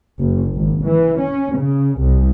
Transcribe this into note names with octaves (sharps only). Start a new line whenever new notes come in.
F#1
G#1
E3
C#4
C#3
C2